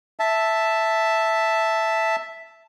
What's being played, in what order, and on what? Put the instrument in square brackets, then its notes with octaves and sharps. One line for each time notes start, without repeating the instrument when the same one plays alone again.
[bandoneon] E5 A5